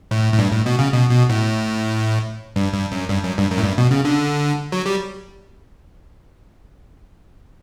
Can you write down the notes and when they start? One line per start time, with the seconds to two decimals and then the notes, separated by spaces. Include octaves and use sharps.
0.11 A2
0.33 A2
0.39 G2
0.52 A2
0.66 B2
0.79 C#3
0.93 B2
1.11 B2
1.29 A2
2.56 G2
2.73 G2
2.92 F#2
3.09 G2
3.23 F#2
3.38 G2
3.50 F#2
3.58 A2
3.63 G2
3.78 B2
3.91 C#3
4.05 D3
4.72 F#3
4.86 G3